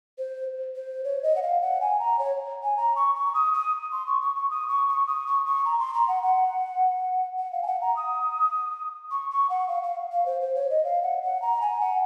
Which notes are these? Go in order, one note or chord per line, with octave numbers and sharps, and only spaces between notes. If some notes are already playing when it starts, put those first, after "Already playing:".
C5
C5
C#5
D#5
F#5
F5
F#5
G#5
A#5
C#5
G#5
A#5
C#6
C#6
D#6
D#6
C6
C#6
C#6
C#6
D#6
C#6
C#6
D#6
C#6
C#6
A#5
C6
A#5
F#5
F#5
F#5
F5
G#5
F#5
A#5
D#6
C#6
C#6
F#5
F5
F5
F5
C5
C5
C#5
D#5
F5
F#5
F#5
A#5
G#5
F#5